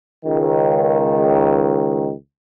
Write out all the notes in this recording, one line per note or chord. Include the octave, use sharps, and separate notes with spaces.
C#2 D#3